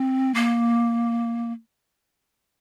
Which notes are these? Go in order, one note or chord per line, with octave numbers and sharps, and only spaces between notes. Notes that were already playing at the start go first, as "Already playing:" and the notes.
Already playing: C4
A#3